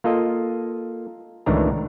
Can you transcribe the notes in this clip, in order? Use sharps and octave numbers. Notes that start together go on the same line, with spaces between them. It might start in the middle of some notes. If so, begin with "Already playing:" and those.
A#3 F4 A4 D#5
C#2 A2 D#3 E3 D4 A#5